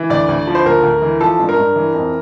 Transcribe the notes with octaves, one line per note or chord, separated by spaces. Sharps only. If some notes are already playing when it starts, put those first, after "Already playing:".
Already playing: E3
D2 D5
D2
F3
C5
D2 A#4
D2
E3
F3 A4
G2
A#4
G2
E3
F2